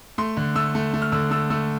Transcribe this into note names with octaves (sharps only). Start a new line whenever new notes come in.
A3 C6
D3
A3 E6
A3
A3
F6
D3 E6
A3 E6
A3 E6